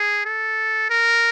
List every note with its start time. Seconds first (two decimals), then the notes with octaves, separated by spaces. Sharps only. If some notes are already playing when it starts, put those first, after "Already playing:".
Already playing: G#4
0.25 A4
0.90 A#4